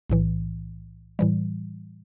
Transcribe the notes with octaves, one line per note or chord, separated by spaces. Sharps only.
B1 A2 E3
A2 E3 G3